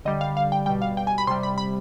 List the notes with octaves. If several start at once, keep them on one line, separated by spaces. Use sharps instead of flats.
D3 G3 D#5
F5
F5
G5
B2 G3 G5
F5
G5
G#5
B5
C3 G3 C6
B5
B5